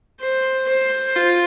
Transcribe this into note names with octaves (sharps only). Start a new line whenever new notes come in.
C5
C5
F4